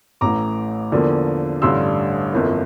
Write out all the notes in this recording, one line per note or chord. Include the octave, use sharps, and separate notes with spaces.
A1 A2 E3 A#5 D6
E2 D3 F3 A#3
A1 G2 D3 G3 C6 E6
G1 F2 E3 A#3